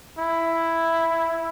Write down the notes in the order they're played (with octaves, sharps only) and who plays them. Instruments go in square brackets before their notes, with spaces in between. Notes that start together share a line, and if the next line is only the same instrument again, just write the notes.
[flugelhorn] E4